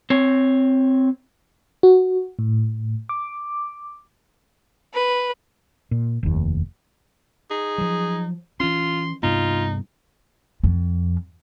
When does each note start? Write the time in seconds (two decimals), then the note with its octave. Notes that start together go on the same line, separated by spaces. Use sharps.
0.10 C4 C#5
1.83 F#4
2.39 A2
3.09 D6
4.93 B4
5.91 A#2
6.23 F1 D#2
7.51 D#4 G#4
7.78 F3 F#3
8.60 E3 C#4 F4 C6
9.23 G2 C3 B3 D#4 F4
10.64 F2